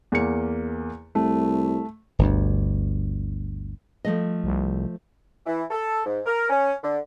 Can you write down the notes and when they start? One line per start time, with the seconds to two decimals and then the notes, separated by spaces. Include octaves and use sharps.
0.12 E2 A#3 C#7
1.15 C2 A3
2.19 G1 D2
4.05 F3 A3 D#5
4.44 C2
5.46 E3
5.71 A4
6.06 G#2
6.26 A#4
6.50 C#4
6.83 D3